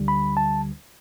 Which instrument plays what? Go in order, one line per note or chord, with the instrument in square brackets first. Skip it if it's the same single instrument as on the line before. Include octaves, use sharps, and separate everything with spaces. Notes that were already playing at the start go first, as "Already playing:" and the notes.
Already playing: [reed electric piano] D2 D3 G3
B5
A5